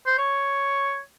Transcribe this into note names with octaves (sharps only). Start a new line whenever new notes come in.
C5
C#5